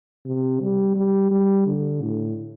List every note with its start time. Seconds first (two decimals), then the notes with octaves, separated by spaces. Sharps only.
0.26 C3
0.60 G3
0.96 G3
1.31 G3
1.67 D3
2.02 A2